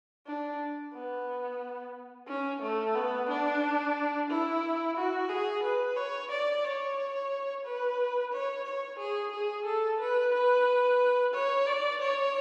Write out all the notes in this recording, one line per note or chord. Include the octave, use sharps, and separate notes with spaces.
D4
B3
C#4
A3
B3
D4
E4
F#4
G#4
B4
C#5
D5
C#5
B4
C#5
C#5
G#4
G#4
A4
B4
B4
C#5
D5
C#5